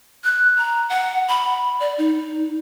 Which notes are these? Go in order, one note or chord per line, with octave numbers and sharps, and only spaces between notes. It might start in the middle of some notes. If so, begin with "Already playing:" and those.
F#6
A#5
F#5
B5
D5
D#4